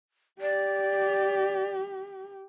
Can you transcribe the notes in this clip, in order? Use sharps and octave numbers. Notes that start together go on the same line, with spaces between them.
G4 D5